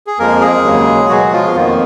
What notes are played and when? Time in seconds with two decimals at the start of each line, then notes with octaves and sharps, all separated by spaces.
0.07 G#4
0.19 F2 F3 G#3 A#3 A#4
0.41 G#3 G#4
0.64 D#2 C#3 F#3 A#3
1.09 B2 F#3 G#3 F#4
1.32 F3 F4
1.54 F2 D#3 A#3 B3